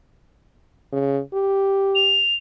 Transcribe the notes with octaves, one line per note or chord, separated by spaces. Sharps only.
C#3
G4
F7